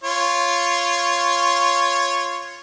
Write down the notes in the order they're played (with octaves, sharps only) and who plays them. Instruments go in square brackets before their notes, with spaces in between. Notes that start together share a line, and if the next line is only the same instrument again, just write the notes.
[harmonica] F4 C#5